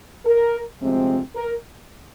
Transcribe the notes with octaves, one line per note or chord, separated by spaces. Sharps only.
A#4
D2 C3 F3 G#3 C4
A#4